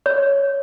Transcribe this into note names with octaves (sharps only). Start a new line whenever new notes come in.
C#5